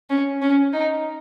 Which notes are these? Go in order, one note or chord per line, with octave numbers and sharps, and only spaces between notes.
C#4
C#4
D#4